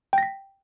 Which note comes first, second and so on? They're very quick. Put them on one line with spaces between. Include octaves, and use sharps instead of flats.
G5 A#6 B6